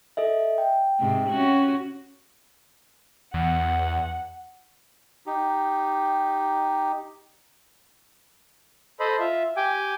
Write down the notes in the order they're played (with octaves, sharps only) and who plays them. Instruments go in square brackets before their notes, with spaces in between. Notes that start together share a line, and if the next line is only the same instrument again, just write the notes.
[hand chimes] A4 D#5 E5
G5
[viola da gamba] G#2 C3
C#4 F#4
[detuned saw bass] E2 [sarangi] F#5
[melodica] D#4 G4
[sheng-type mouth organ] A4 C5 D#5 B5
F4 E5
G4 G5 G#5 D6